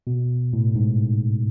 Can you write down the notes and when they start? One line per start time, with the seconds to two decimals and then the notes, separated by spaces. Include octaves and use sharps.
0.07 B2
0.53 A2
0.75 G#2